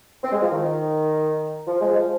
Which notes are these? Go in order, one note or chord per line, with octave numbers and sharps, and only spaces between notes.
C4
G#3
F3
D#3
F3
G#3
F3